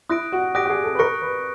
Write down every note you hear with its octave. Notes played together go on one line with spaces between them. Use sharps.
E4 D#6 F#6 A#6 D7
F#4
G4 D#6 F#6 A#6 D7
G4
G#4
A4
B4
A#4 C#6 F#6 A#6 C#7
B4